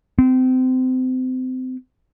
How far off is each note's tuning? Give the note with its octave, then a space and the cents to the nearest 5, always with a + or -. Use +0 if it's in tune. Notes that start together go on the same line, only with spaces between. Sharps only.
C4 -30